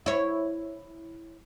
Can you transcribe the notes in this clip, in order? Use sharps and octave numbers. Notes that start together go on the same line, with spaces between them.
E4 C#5